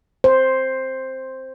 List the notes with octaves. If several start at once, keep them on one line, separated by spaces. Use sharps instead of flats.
C5